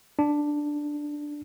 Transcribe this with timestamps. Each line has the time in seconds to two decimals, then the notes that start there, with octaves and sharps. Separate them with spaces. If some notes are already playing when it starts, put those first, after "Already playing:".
0.19 D4